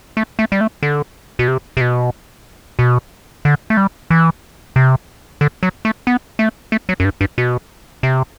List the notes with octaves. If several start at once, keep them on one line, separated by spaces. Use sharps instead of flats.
A3
A3
G3
A3
D3
B2
C3
C3
B2
B2
D3
A3
G3
E3
C3
D3
F#3
A3
B3
A3
A3
F#3
F#2
G2
G2
B2
C3